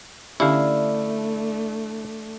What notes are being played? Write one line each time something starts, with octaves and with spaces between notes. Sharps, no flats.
D3 A3 C#4 D4 E4 G4 F5